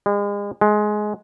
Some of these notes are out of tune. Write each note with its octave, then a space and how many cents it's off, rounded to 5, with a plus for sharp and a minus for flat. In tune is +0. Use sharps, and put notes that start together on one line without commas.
G#3 -40
G#3 +15